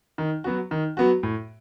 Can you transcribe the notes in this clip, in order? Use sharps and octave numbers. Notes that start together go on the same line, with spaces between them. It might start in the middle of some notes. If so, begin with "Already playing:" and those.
D#3
F#3 B3 F#4
D#3
F#3 B3 F#4
A2